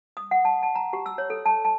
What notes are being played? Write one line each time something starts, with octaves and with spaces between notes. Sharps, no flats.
D#6
F#5
A5
A5
A#5
G4
E6
C#5
A4
A5
A5